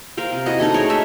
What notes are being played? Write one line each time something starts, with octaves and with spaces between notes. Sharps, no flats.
A#4 C5 F5 G5
C3
E4 F#4 D#5
D#4 A4 D#5 G#5
A3 G#4 A#4 C#5
D#4 E5 G#5